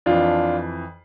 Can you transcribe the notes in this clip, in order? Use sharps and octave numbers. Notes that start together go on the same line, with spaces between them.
F2 E3 D4 F4